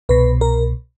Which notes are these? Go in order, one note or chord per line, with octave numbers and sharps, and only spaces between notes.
C2 B2 B4
A#4